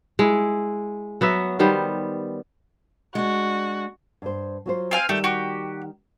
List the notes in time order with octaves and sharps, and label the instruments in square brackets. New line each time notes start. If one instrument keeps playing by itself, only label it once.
[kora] G#3 E4
F#3 B3 F#4 E5
D#3 G3 B3 C5
[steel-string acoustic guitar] G#3 D4 [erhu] F#4
[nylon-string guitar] G2 C5
F#3 F4 C5
[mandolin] C4 F5 G#5
[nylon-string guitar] D#3 G3 [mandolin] A3 G4
[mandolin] F#4 G4